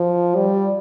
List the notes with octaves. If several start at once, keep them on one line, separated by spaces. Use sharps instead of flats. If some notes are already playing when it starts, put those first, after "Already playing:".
Already playing: F3
G3